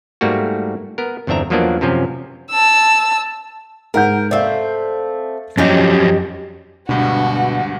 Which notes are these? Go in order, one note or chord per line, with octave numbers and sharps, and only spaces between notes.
G#2 G3 A3 A#3 F#4
B3 A#4
G1 E2 C4 D4 E5 A#5
E2 F3 F#3 A#3 B3 D4
F#2 C3 F3 C4 C#4
A5 E6
G#2 A#4 F#5 G6
A3 C4 D5 F5
F2 F#3 C#4 D#4 G4 D5
D2 G2 B2 G#3 D4 F#4